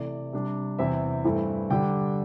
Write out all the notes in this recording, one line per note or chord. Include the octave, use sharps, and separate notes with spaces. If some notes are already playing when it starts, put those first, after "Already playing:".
Already playing: C3 E3 A3 D5
C3 G3 D4
E2 C3 E3 C4 E4 E5
G2 E3 A3 C4 E4
D3 G3 D4 G5